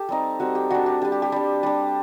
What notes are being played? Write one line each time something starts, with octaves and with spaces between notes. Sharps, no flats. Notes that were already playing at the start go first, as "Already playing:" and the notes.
Already playing: G4 A4
G3 C4 D#4
G3 C4 D#4 F#4
G4
G3 D4 F#4
G4
G3 D4 G4
G4
G4
G3 D4
G3 D4